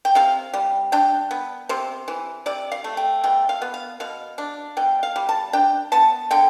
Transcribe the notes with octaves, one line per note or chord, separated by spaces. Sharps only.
G5
C3 F5
G3
D4 G5
B3
C3 C5
E3
C3 D5
F5
A3
G5
B2 G5
F5
B3
F5
B2 F5
D4
B2 G5
F5
G3
A5
D4 G5
B3 A5
D3 G5